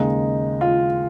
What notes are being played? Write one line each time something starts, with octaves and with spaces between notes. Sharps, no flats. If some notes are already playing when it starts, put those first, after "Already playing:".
Already playing: D#2 C#3 G#3 D#4
F4